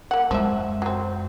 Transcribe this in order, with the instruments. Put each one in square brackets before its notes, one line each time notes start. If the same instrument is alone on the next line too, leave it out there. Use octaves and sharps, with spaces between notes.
[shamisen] A#3 F#5
[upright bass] F#2 G#3 [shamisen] F3 E5
[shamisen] F#3 C4